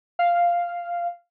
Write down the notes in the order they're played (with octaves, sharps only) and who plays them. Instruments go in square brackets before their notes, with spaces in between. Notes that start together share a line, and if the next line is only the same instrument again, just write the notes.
[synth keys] F5